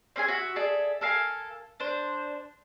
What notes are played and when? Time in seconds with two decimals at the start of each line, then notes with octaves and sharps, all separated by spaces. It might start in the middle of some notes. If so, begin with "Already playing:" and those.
0.16 C4 C#4 G#4 G#5
0.28 F#4 E5
0.56 G#4 A4 D5 E5
1.01 A4 A#4 F5 G#5
1.80 D4 C5